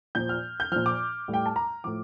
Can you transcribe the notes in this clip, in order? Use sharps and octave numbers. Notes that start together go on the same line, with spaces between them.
A#2 F3 G6
F6
G6
A#2 F3 F6
D6
A2 G3
G5
A5
A#5
A2 F3 D6